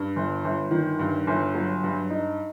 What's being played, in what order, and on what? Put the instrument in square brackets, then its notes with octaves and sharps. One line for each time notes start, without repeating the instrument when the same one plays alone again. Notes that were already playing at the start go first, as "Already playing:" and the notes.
Already playing: [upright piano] G2
G1
G1
D#3
G2
G1
F#3
G2
D#4